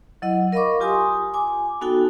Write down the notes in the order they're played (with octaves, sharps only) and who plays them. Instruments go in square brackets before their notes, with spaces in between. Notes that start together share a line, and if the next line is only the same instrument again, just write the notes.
[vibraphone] F#3 E4 D#5 F#5
A#4 D#5 F5 B5 C#6 D6
F4 G4 G#5 C6 D#6
G#5 D6
B3 D#4 F#4 A4 G5 A5